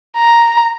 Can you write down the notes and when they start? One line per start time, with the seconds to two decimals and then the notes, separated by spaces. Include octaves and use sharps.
0.17 A#5